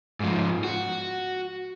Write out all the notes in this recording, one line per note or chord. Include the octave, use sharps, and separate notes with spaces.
G#2 F3
F#4